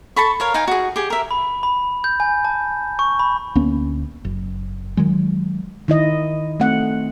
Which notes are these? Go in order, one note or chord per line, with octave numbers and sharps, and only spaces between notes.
A4 A5 B5 C#6
A#4 C#5 F5
D#4 F5 G5 G#5
F#4 G#4
G4 G#4
A#4 E5
B5
B5
G6
G#5
A5
C#6
B5
D2 A#3 B3 C#4
F#1
D#3 F#3 G#3
D#3 E4 D#5
A3 C4 F#5